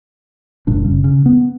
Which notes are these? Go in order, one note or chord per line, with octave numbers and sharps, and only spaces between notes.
F#1 A#2 G3 D4
F#1 C#3
C#3
B3